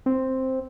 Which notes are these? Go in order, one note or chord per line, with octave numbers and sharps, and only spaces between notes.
C4